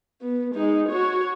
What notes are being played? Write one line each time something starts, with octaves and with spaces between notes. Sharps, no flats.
B3
G#3 D#4
F#4 C#5